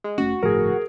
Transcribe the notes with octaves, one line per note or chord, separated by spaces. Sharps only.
G#3
F1 A3 C#4 F#4
G1 A2 F3 G#4 A#4